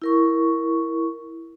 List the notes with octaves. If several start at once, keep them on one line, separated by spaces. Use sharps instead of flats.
E4 A#4 C#6